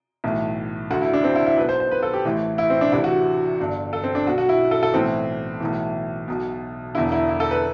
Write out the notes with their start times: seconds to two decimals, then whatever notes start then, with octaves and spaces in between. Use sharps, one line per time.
0.24 B1 A2 E3
0.90 D2 D3 F#4
1.02 E4
1.14 D4
1.24 C4
1.36 E4
1.46 E4
1.57 B1 B2 B4
1.69 C5
1.80 C5
1.91 B4
2.03 A4
2.14 G4
2.25 A1 A2 E3
2.58 E4
2.70 C4
2.81 D4
2.92 D2 C3 E3 E4
3.04 F#4
3.60 G1 G2 D3
3.93 A4
4.04 C4
4.15 D4
4.26 B1 B2 F#4
4.38 F#4
4.49 E4
4.71 A4
4.83 A4
4.94 B1 A2 E3 C4
5.60 B1 A2 E3
6.28 B1 B2
6.95 E1 E2 D3 E4
7.12 E4
7.29 E4
7.40 A4
7.51 B4